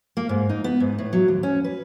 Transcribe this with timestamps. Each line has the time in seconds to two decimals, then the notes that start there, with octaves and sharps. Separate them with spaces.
0.17 A#3
0.29 G#2
0.49 D#4
0.64 B3
0.80 G#2
0.99 A2
1.13 F#3
1.28 D#2
1.43 C#4
1.64 B4